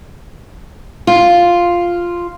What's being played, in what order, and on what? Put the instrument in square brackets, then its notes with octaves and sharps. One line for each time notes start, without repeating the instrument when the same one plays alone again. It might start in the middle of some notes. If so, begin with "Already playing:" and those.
[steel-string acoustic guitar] F4